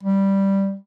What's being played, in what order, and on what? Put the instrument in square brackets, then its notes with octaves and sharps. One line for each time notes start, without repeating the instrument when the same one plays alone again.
[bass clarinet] G3